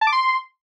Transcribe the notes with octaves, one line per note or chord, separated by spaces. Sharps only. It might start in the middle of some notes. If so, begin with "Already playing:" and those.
A5
D6
C6